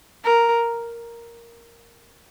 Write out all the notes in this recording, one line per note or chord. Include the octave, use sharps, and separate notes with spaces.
A#4